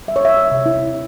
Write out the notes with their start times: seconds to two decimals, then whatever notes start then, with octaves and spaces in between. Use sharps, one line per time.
0.08 G3 E5
0.16 C#5
0.25 E5
0.37 C#5
0.52 C3
0.66 E4